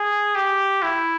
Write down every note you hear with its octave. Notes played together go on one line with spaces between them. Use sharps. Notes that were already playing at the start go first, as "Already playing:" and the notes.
Already playing: G#4
G4
E4